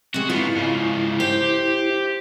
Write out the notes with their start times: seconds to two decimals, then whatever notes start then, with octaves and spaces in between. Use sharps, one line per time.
0.14 C3 G#3 F#4
0.30 G#2 B3 E4 F4
0.56 G#2 C#3
1.20 G4 C5